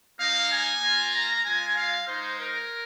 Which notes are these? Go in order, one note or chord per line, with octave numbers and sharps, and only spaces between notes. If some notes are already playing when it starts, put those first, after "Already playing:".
A#3 D#4 F5
G#5
A#3 F4
A#5
G#3 F4 G#5
F5
G#3 D#4 C5
A#4